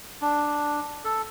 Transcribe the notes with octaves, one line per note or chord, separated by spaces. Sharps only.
D4
A4